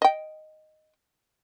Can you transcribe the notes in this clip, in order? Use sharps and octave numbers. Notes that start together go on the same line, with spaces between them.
D#5 G5